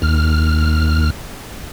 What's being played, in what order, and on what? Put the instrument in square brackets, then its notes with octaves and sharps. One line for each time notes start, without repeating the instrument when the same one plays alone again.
[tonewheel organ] D#2 F6